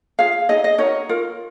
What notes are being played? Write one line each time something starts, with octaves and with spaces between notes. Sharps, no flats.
F4 G#4 F5
D#4 G#4 D#5
D#5
D#4 F#4 A#4 C#5
F4 A#4